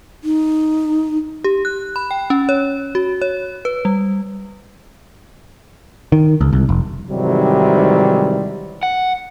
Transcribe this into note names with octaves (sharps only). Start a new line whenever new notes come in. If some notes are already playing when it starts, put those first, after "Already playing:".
D#4
G4
F#6
B5
G5
C#4
C#5
F#4
C#5
B4
G3
D#3
C#2
C2
F1
G#2 C3 D#3 E3 F#3 G3
F#5